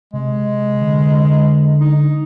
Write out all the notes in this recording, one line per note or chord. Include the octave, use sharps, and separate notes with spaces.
C3 G#3
D3
D#4